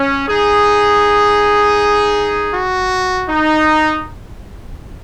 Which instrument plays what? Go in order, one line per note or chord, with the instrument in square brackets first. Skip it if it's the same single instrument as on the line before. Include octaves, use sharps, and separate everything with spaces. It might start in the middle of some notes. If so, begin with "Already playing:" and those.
Already playing: [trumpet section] C#4
D#4 G#4
F#4
D#4